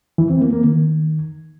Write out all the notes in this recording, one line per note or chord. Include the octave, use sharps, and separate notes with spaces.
E3
C4
A#3
A#3
D#3